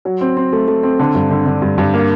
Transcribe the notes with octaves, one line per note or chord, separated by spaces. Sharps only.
F#3
C4
C4
A3
A3
C4
D3
G2
D3
D3
G2
G2
A#3